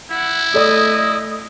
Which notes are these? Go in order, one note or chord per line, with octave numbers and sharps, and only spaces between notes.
E4 F#5
A3 A4 D5 D#5 D#6